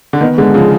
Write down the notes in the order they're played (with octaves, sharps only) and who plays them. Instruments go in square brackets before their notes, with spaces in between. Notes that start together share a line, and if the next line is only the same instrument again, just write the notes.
[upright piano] D3
[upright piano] D#3 [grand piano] B3
[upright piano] D3 [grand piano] G#3
[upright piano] C#3 [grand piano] F3